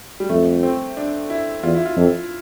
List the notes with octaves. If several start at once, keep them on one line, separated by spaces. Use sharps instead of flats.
G3
F2 A3
C4
D4
E4
E2 F4
E4
F4
F2